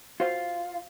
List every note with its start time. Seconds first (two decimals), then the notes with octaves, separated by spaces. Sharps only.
0.20 F4 F#4 C5 F5